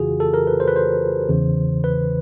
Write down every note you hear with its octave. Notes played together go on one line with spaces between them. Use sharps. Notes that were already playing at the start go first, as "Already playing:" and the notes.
Already playing: F2 C#3 E3 F4 F#4 G#4
A4
A#4
B4
C5
B4
C5
E2 C#3 E3
B4